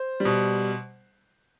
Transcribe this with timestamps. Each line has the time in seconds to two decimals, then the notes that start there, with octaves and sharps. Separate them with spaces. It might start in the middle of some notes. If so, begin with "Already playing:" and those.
Already playing: C5
0.20 B2 G3